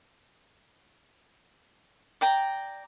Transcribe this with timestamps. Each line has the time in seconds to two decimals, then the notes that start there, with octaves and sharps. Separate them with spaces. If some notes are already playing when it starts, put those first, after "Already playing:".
2.21 D5 G5 A#5